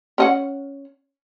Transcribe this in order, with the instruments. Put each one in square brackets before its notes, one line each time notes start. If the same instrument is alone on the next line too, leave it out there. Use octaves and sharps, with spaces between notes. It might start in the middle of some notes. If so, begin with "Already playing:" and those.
[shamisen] C#4 D#5 F#5